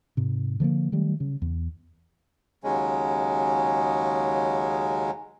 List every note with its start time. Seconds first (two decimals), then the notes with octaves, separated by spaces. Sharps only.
0.17 G#2 C3
0.60 D3 F3 G#3 A#3
0.92 D#3 F#3 G3 A3
1.20 C#3
1.42 E2
2.64 D#2 C#3 F#3 G#3 C#4